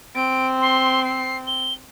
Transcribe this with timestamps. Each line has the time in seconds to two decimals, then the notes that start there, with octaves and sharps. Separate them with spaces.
0.15 C4 D7
0.61 C6
1.05 C7
1.47 G7